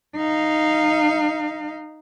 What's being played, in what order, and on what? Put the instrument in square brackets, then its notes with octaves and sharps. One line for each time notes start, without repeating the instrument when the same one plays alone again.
[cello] D#4 F5